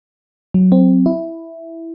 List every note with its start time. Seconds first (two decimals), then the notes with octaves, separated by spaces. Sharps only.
0.54 F#3
0.72 C4
1.06 E4